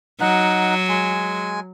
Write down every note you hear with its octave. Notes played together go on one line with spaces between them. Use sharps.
F#3 D#4 F#5
G#3 G#5